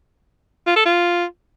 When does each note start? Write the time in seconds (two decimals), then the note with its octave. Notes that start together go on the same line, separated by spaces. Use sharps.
0.67 F4
0.76 A4
0.85 F4